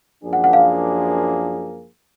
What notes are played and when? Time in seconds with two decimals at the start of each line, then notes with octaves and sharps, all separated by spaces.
0.23 F#2 F3 A#3 D4 G#4
0.33 F#5
0.44 F#5
0.53 F5